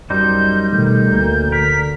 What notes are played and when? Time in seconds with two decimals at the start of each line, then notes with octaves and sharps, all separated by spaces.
0.10 F#2 G3 D#4 C5 G6
0.72 B2 D#3 A3 G6
1.09 D2 A#3
1.52 D3 A#4 B6